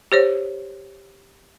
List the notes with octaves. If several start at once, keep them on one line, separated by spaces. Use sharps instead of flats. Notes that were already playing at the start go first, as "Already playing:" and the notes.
G4 C5 C#5